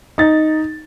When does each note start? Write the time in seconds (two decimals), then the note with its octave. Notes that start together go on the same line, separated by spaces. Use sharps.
0.18 D#4 A6